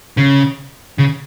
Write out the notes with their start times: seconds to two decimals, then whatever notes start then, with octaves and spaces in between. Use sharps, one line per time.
0.17 C#3
0.98 C#3